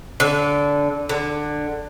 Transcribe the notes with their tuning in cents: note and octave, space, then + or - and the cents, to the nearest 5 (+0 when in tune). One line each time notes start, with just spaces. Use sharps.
D3 -20
D3 +15